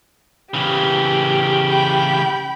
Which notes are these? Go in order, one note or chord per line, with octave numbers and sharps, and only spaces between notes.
C#3 E3 G4
G5 B5